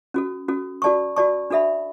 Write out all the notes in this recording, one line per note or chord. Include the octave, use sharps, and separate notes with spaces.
C#4 F#4 A4
C#4 F#4 A4
F#4 A4 D5 A5 C#6
F#4 A4 D5 A5 C#6
D4 F#4 A4 E5 B5